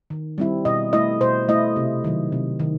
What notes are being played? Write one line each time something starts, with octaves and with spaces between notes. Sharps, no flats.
D#3
G3 C4 E4
B2 D#5
A3 E4 D#5
B2 C5
A3 E4 D#5
C3
D#3 F#3
C3
D#3